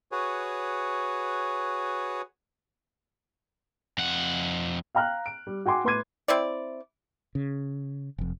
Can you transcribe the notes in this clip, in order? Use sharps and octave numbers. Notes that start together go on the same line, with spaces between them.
F#4 G#4 B4 C#5
F2 F#5
F5 G5 A#5 F6 F#6
D7
G3
F#4 G5 G#5 C6 D6
A2 B4 C6 D6 G#6 D#7
C4 E4 D5
C#3
F1 F2